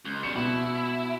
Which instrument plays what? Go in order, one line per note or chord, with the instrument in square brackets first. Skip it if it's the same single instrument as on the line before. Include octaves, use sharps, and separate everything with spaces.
[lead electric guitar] C#2
[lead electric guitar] B2 G3 [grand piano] C#7
[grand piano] B2 [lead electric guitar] E4